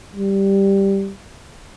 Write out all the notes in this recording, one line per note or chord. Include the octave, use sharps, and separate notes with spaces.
G3